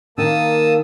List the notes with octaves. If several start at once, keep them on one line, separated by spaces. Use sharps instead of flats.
D#3 A#3 A5 D#6 E6